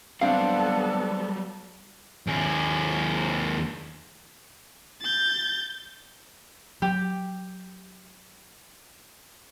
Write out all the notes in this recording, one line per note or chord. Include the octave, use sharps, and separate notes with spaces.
F#3 G3 B3 C4 D4 A4 F5
D#2 G#4
G6 A6
F#3 G4